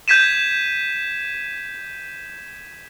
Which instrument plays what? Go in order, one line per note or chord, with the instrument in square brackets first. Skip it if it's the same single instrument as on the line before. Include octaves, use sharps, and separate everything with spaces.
[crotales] G6 G#6 B6 D#7 E7